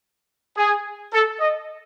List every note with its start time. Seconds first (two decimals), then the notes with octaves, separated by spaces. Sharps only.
0.56 G#4
1.12 A4
1.40 D#5